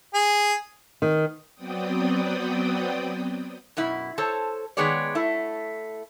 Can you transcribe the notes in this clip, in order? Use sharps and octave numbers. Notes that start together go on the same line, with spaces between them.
G#4
D#3
F#3 B3 C4 D5 G5 D#6
F#2 B2 E4
A4 C5 C#5 A5
D#3 G#3 B3 G#4 C#5 D5
A3 E4